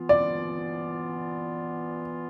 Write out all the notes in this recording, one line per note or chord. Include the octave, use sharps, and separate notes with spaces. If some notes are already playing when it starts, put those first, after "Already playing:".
Already playing: E3 B3 F4
D5